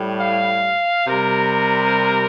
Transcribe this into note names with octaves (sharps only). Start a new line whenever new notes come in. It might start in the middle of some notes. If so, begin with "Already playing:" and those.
Already playing: A2 G3
F5
C3 G3 A#4